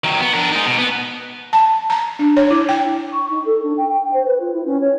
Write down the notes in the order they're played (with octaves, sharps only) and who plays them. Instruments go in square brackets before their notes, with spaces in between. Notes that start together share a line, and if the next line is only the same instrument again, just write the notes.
[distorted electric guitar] D#3 F#3
B3
D4 A#4
G#3 D#4
B2
B3
[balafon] A5
A#5
D4
C#5
E4
G5
[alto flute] C#6
D#4
A4
D4
G5
G5
C5
B4
F4
E4
C#4
C#5